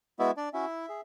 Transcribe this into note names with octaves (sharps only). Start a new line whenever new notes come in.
G#3 B3 E4 F#4 E5
D4 D5
C#4 E4 F#4 E5
G#4